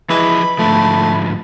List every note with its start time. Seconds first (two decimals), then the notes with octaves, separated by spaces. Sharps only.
0.10 E3 F3 G#4 D#5 B5
0.59 G#2 D3 F3 A3